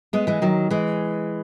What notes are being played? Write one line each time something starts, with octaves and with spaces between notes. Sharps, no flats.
G#3 B3
E3 G#3
D#3 F#3
E3 G#3